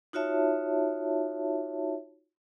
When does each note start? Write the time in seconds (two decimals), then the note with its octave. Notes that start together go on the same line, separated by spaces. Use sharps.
0.13 D#4 F4 F#4 C#5 E5 A5